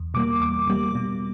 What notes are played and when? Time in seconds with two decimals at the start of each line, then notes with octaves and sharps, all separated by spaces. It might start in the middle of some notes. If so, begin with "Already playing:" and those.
Already playing: E2
0.14 B2 G3 A#3 D6
0.41 E2 D6
0.67 B2 G3 A#3
0.95 B2